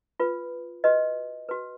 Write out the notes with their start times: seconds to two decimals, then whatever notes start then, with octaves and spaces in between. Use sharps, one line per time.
0.20 F4 B4
0.84 F#4 B4 D#5
1.49 F#4 B4